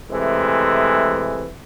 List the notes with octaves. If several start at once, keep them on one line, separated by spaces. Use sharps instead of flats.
C3 E3 G#3 A3